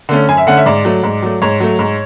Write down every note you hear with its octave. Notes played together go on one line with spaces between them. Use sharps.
D3 A3 C#4
F#2 G#5
E5
D3 A3 C#4 F#5
E5
G#2 D5
F#3 A3
G#2
F#3 A3
G#2 C#5
F#3 A3
G#2